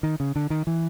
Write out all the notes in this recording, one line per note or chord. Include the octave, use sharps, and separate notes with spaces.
D#3
C#3
D3
D#3
E3